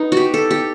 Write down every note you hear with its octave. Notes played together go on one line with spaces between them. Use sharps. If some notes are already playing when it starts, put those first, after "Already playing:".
Already playing: B3 D#4
F#4 G4
A4
G4